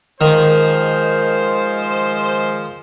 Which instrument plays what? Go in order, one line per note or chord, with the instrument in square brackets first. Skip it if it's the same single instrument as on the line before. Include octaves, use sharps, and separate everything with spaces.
[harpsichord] D#3 [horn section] F3 G#3 C5